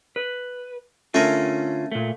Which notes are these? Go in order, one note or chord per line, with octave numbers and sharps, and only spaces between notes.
B4
D3 A3 C#4 F4 A#4
A#2 A3